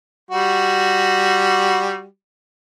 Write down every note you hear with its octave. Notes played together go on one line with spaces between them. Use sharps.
G3 F#4